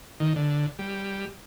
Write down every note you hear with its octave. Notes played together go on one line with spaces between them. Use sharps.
D#3
D3
G3